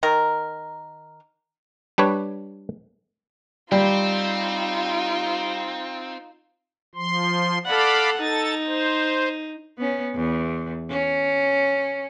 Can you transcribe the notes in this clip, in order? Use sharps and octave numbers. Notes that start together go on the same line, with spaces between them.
D#3 A#4
G3 D4 B4 C#5
G3 C4 D#4 F4 D5
F3 C6
A4 D5 F5 F#5 B5
D#4 A4 A6
C5
B3 C#4
E2
C#4